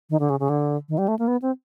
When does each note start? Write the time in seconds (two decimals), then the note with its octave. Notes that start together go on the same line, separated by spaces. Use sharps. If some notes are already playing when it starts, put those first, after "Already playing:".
0.10 D#3
0.20 D3
0.30 C#3
0.40 C#3
0.49 D3
0.89 D#3
0.98 G3
1.08 A3
1.19 A#3
1.28 B3
1.42 C4